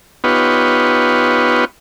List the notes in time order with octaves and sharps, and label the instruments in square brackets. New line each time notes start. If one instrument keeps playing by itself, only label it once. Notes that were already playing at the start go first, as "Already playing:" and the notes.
[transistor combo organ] B3 D#4 F4 G4 B4 C#5